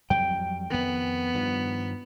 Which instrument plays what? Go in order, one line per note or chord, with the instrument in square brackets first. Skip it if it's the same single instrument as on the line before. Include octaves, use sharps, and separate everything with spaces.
[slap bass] F2 F#3 G3 [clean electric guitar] G5
[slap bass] F2 D#3 [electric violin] B3
[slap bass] G2 D#3 F3